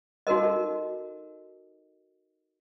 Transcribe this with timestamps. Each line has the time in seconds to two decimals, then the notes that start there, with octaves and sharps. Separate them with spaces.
0.27 D#4 F#4 A4 A#4 D#5